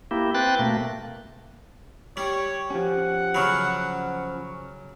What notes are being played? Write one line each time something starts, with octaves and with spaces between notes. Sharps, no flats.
A#3 E4 G4
C4 B4 G5 F#6 A6
B2 A3 A#3
G3 C#5
F3 C#4 G4 F#5
C#3 F#3 B5 C#6 F6